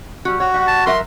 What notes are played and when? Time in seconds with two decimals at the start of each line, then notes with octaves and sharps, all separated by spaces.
0.25 G3 F#4
0.40 F#4 C#5
0.54 G3 F#5
0.67 A5
0.86 F#3 A#4 E5 C6